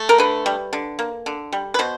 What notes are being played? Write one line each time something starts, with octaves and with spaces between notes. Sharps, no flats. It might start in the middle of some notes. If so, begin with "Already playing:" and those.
Already playing: A3
A#4
D3 B4
G3
D3
A#3
D3
G3
B4
B2 C5